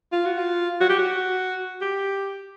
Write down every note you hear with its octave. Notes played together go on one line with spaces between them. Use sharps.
F4
F#4
F4
F#4
G4
F#4
G4